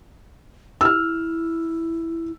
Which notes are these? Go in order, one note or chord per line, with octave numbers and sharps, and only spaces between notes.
E4 E6 F6